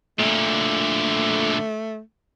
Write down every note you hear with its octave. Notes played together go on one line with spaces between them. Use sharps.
A#2 D3 A3